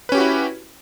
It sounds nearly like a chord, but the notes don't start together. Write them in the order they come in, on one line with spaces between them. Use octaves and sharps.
B4 C#4 G4 F#4 E4